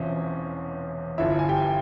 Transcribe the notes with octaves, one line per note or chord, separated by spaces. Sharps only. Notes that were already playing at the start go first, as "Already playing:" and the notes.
Already playing: E1 E2 C3 F3 C#4 C5 E5
G1 G2 F3 E4 E5
G#5
G4 G5